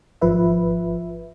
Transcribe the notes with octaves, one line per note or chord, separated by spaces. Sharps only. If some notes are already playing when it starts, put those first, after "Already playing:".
G#1 F3 B4 E5